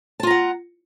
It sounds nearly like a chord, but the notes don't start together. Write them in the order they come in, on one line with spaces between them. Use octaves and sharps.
A5 F4 A#5 F#5